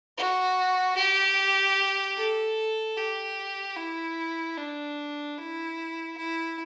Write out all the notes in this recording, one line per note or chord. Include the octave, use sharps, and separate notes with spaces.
F#4
G4
A4
G4
E4
D4
E4
E4